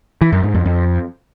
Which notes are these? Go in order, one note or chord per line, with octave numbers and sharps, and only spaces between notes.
E3
F#2
G#2
F2
F2